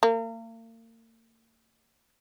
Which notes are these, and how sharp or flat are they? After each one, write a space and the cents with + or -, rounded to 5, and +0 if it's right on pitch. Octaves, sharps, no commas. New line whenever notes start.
A#3 -40